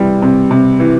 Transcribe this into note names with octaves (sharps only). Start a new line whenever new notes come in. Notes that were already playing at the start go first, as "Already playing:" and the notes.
Already playing: C3 E3 G3
C3
C3
E3